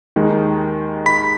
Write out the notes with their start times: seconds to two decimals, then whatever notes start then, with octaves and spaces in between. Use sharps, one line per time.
0.16 D#2 D#3 G#3 D#4
1.06 B5 B6